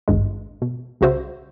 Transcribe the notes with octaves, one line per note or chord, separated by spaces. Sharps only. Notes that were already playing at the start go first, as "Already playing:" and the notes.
G#1 C#2 G2 G#3
B2
C2 C#3 F#4 C5 E5